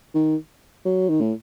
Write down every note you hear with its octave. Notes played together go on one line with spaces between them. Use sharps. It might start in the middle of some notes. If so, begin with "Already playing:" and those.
D#3
F#3
D#3
A2